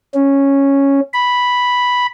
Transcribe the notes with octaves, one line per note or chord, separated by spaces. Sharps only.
C#4
B5